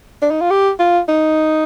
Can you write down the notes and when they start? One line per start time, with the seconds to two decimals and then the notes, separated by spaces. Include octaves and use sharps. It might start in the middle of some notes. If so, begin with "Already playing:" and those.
0.22 D4
0.31 D#4
0.41 F4
0.50 G4
0.79 F4
1.08 D#4